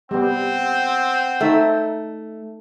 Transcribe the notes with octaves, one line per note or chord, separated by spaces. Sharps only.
G3 B3 C4 F#5
A3 D#4 E5